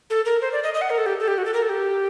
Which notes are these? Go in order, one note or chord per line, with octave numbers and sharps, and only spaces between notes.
A4
A#4
C5
D5
D#5
D#5
F#5
A#4
A4
G4
A4
G4
F#4
A4
A#4
A4
G4